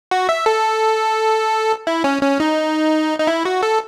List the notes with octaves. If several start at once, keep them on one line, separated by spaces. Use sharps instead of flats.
F#4
E5
A4
E4
C#4
C#4
D#4
D#4
E4
F#4
A4